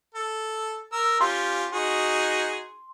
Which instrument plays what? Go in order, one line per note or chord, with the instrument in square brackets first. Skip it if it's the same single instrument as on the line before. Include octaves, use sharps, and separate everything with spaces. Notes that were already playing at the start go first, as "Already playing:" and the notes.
[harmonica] A4
A#4 E6
[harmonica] C#4 F4 G4 [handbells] C6
[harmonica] D#4 F#4 G#4